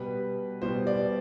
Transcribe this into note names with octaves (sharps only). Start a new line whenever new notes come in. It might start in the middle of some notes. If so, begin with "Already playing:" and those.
Already playing: B2 G3 B3 B4
B2 G3 B3 C5
D5